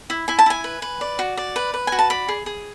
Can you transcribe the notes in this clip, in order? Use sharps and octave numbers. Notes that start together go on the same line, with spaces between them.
E4
E4 G#5
A5
E4 G#5
B4
B4
D5
F#4
D5
B4
B4
F#4 G#5
A5
D5 B5
G#4
G#4